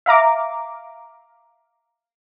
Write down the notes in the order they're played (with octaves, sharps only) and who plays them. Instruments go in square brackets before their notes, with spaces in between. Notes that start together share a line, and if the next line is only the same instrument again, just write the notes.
[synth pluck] E5 F5 A#5 D6